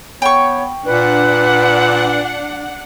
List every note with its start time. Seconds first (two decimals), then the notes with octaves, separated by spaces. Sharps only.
0.22 B3 C#5 G5 C#6
0.86 A#2 D4 B4 F#5